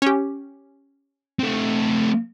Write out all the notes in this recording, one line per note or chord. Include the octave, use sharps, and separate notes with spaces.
C#4 G4
A3 C4